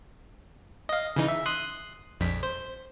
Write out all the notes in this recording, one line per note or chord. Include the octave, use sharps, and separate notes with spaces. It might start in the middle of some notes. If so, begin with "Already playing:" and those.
D#5 F5
C#3 E3 D#4
E5
C6 D#6 F#6
A#1 F2 B6
C5